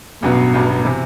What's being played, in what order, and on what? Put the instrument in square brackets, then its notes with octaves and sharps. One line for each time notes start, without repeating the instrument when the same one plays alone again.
[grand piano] A1 G2 F#3 B3 [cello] B2
[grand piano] A1 G2 F#3 B3
C3 E3